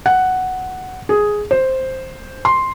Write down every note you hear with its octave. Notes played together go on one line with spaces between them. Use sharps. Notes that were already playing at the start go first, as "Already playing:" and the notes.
F#5
G#4
C5
C6